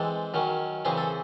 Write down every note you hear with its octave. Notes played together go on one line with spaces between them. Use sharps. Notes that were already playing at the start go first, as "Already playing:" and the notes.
Already playing: E3 G#3 C4 A4
D#3 F#3 C#4
C#3 E3 C4 G#4
A4